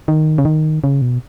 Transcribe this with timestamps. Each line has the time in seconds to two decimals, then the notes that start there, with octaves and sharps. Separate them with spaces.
0.08 D#3
0.38 C#3
0.45 D#3
0.84 C#3
1.02 B2